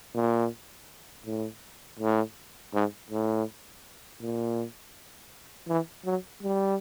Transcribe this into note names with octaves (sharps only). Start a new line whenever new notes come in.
A#2
A2
A2
G#2
A2
A#2
E3
F#3
G3